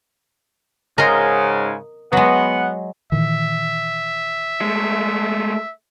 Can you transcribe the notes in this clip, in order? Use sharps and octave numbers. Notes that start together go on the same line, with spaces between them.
G#2 C#3 G#3 A#4 D#5 C6
F#3 G#3 B3 F#5
A#2 D#3 E3 E5
G#3 A3